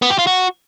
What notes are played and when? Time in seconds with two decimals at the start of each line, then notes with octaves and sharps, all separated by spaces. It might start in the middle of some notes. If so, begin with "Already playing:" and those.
0.02 B3
0.10 G4
0.19 F4
0.27 F#4